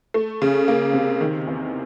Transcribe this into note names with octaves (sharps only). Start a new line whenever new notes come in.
A3
C#3
A#3
C3
D#3
E2